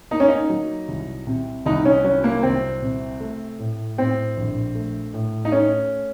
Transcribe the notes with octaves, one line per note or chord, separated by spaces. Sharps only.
A#3 D#4
C#4
D#4
F#3
C2
C3
C2 D#4
C#4
F#3 C#4
A#3
C2 C4
C3
A3
A2
A2 C4
A#1
A3
A2
D#4
A3 C#4